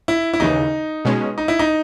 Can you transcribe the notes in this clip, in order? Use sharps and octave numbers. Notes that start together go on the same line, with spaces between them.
E4
E4
D#2 C#3 E3 D#4
B2 G#3 C#4
D#4
E4
D#4